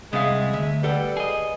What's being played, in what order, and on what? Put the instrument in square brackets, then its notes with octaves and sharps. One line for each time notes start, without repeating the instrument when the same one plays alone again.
[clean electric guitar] C2 [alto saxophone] G#3 [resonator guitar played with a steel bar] B3 E5 F5
[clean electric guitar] D2 [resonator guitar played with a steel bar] E5
[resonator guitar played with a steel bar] G3 A4 F#5 [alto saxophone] B4
[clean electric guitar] G#4 D#5